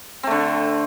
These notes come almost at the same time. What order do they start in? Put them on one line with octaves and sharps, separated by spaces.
C4 A3 D3